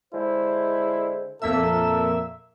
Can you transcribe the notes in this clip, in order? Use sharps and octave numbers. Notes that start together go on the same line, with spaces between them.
D3 G#3 E4 C5
F2 A#2 A#3 A4 E5 E6